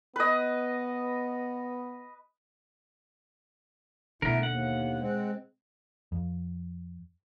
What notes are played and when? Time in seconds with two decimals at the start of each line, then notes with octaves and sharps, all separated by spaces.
0.16 B3 B4 D#5
4.22 B2 D3 A3 B3 E4 A#4
4.43 D#2 F#5
4.99 G#3 C4
6.12 F2